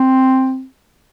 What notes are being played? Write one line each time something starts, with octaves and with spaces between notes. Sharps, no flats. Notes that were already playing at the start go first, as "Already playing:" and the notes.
Already playing: C4